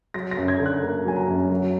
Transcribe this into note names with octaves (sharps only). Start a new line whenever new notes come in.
F#3 A#6
A#6
F#2
G#6
D3
F#6
A#3
F#3 G#5
A#5
F#2
F#3